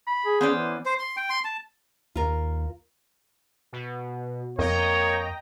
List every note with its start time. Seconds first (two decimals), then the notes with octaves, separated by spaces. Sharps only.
0.07 B5
0.26 G#4
0.41 B3 C#4 C5 D5
0.54 E3
0.86 C5
0.99 C6
1.17 G5
1.30 C6
1.44 A5
2.15 D#2 F4 A#4
3.73 B2
4.59 F2 A#3 C#5 D#5 G5 A#5